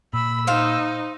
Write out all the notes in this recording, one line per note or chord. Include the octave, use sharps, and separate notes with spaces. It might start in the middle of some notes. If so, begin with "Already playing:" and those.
A#2 B5 E6
D#4 C5 F5